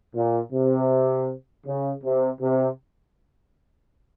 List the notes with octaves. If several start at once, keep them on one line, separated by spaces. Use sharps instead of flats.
A#2
C3
C#3
C3
C3